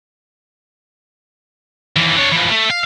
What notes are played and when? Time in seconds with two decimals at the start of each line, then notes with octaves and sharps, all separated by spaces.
1.96 D#2 E3
2.16 D4 C#5
2.32 E3 F3
2.52 A3
2.71 F5